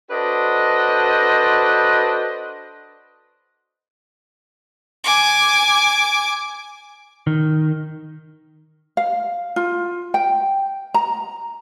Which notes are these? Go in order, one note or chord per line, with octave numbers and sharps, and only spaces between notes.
D4 F#4 A4 B4 C5 D#5
G#5 D6
D#3
F5
F4
G5
A#5